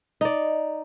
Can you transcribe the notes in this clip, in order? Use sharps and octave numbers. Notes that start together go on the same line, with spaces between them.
D#4 D5